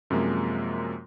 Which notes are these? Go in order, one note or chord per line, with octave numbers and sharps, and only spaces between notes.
F#2 C3 F3 G#3 A#3